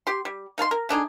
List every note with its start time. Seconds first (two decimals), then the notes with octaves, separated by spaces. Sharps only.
0.07 G4 C6
0.25 G3
0.58 D#4 F5 A5 C6
0.71 A#4
0.89 A3 D4 D#4 G#4